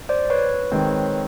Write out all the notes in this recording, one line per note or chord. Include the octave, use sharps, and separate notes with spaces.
C5 D5
B4 C#5
D#3 G#3 C4